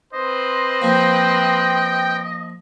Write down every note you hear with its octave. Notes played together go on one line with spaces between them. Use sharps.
C4 B4 C5 D#5
F3 A#3 G5